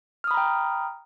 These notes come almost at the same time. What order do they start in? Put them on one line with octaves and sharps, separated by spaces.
F6 D#6 B5 A#5 G5